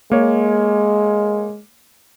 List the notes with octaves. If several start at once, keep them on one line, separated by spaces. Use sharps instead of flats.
G#3 A#3 C#5